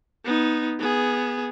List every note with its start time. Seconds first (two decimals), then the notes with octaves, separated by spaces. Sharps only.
0.25 B3 D#4
0.79 B3 G#4